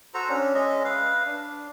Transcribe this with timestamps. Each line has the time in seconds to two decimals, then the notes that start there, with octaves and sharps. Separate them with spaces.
0.14 F#4 A4 C5 A#5
0.29 C#4 D4
0.55 G#3 C#4 D#5 E5
0.85 B4 F5
1.26 D4